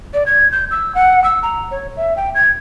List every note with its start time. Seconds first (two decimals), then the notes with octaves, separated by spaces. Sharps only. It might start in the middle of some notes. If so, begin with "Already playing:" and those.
0.14 D5
0.26 G#6
0.52 G6
0.71 E6
0.95 F#5
1.24 E6
1.43 A#5
1.71 C#5
1.97 E5
2.16 G5
2.35 G#6